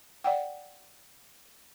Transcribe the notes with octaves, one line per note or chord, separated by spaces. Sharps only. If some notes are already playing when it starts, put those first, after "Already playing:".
D5 F#5 G5